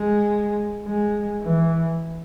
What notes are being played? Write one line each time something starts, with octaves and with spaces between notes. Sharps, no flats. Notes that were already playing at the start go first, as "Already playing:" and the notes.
Already playing: G#3
G#3
E3